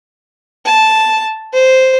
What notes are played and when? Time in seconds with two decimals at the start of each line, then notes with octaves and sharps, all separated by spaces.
0.65 A5
1.54 C5